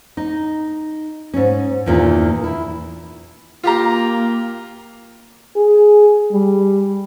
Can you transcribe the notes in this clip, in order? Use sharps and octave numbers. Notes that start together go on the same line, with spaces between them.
D#4
G#2 C#4
E2 G2 A#2 D#3 E3
E4
A#3 F4 G4 A#5
G#4
G3